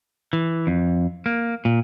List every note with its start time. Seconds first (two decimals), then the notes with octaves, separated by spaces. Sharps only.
0.33 E3
0.67 F2
1.26 A#3
1.65 A#2